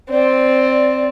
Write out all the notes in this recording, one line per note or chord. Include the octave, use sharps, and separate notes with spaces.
C4 D5